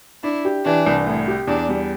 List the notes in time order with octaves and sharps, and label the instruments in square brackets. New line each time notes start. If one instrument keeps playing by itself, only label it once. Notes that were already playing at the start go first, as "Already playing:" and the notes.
[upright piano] D4 [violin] E4
[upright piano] G4
[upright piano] E3 [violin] D4
[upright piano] C2
A2
G4
[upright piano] E2 [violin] D4
[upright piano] G3